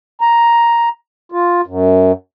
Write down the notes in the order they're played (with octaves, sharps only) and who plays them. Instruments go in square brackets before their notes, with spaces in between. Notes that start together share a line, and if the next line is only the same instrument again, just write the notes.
[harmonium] A#5
F4
F#2